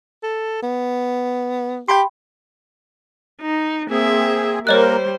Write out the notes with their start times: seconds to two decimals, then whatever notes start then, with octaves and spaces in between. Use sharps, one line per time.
0.23 A4
0.62 B3
1.88 G4 G5 B5 C6
3.41 D#4
3.90 A#3 C4 G#4 E5
4.67 G3 A#3 A#4 C5 C#5 D#5 F#6